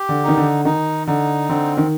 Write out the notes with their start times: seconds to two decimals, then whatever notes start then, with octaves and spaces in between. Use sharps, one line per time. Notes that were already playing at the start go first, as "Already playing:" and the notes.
Already playing: G4
0.09 D3
0.24 D#3 D#4
0.37 D3
0.65 D#3 D#4
1.07 D3 D#4
1.49 D3 C4
1.77 D#3